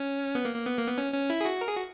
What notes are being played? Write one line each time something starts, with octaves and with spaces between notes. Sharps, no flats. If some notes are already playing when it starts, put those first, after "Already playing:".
Already playing: C#4
B3
A#3
A#3
B3
A#3
B3
C#4
C#4
E4
G#4
F#4
A#4
G#4
F#4